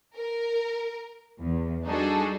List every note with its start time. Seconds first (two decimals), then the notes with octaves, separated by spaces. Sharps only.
0.16 A#4
1.41 E2
1.85 G3 D4 D#4 F#4 G#4 A4